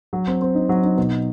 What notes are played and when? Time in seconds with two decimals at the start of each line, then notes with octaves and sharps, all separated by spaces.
0.13 F#3
0.27 C4
0.41 C4
0.55 D#4
0.69 F#3
0.84 D#4
0.97 B2